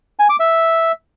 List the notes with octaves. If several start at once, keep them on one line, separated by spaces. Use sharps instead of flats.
G#5
D6
E5